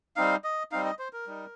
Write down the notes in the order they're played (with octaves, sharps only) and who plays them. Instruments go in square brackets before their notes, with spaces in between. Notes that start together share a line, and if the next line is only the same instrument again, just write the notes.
[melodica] G3 C4 D#4 F5
D#5
G3 C4 D#4 F5
D#5
C5
A#4
G3 D#4